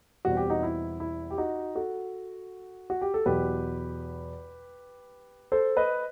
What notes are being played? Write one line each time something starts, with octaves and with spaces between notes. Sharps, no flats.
E2 B2 G3 C4 F#4
G4
D#4 F#4
E4
E4
G4
D#4 F#4
F#4 A4
F#4
G4
A4
E2 B2 F#3 G4 B4
A4 C5
B4 D#5